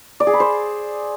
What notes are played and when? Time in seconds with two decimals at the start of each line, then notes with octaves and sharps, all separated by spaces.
0.20 D5
0.27 G#4
0.33 B5
0.40 C5